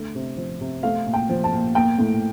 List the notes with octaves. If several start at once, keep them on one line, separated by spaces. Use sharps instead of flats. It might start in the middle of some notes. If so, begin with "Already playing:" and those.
Already playing: D3 A3
C3
F3
C3
A3 F5
A#2
G5
F3
A5
A#2
A#3 G5
A2